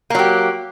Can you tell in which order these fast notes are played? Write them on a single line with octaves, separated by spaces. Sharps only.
A#3 F#3 G4